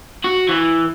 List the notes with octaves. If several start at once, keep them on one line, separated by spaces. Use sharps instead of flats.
F#4
E3